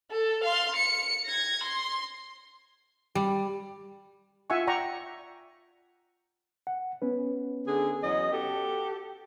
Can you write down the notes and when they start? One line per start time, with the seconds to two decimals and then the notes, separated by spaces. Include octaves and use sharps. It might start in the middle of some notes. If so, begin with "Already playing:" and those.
0.11 A4
0.43 F5 C6
0.76 C#7
1.26 G#6 A#6
1.63 C6
3.15 G3
4.50 F4 E5 F#5 G#5 C#6
4.67 D5 F#5 G5 A#5 C#6
6.67 F#5
7.02 B3 C#4 B4
7.67 D3 G#4
8.03 E2 F#3 D#5
8.32 F#4 G4 A4